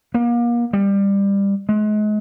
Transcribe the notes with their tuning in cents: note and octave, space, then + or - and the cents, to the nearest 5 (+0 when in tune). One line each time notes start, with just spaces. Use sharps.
A#3 +35
G3 +20
G#3 +35